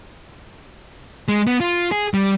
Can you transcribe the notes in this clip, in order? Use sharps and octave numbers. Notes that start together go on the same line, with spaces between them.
G#3
B3
F4
G#4
G3